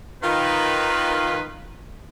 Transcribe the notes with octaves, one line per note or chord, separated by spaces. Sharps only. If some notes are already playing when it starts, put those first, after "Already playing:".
D#3 F4 B4